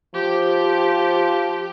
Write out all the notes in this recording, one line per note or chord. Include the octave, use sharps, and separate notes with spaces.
F3 G4